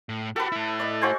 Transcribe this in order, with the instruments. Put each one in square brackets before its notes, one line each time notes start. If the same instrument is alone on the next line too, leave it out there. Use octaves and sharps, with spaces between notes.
[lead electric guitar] A2
[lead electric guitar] F#4 G4 [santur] A4 B4
[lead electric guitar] A3 E4
[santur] D5 D#5
F#4 C5 G#5